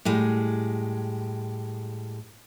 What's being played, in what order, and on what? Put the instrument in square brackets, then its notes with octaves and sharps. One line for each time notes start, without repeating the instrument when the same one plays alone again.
[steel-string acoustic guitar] A2 G3 G#3